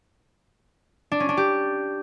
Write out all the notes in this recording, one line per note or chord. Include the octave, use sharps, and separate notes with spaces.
D4
C#4
D4
G4